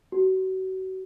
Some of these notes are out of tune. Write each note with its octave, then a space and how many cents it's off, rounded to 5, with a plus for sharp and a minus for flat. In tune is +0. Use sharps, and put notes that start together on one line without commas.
F#4 +30